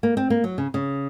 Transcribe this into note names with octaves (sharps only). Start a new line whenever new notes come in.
A#3
C4
A#3
F#3
C#3
C#3